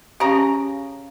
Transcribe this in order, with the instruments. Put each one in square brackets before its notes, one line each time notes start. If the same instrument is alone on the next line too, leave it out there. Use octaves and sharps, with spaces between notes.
[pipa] C#3 A#5 [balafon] C#4 G4